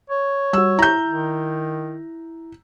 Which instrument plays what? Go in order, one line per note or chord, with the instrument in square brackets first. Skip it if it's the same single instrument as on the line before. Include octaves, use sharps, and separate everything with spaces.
[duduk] C#5
[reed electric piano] G3 F#4 [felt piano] E6
[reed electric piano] E4 [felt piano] A#5 G6
[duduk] D#3